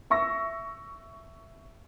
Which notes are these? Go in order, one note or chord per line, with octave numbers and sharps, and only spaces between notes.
E5 C#6 E6 A#6